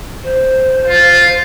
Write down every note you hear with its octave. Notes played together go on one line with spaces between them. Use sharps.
C5
F4